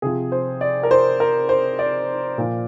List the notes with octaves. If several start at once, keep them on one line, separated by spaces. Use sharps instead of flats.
C3 F3 G#4
C5
D5
A#4
C5
A#4
C5
D5
A#2 F3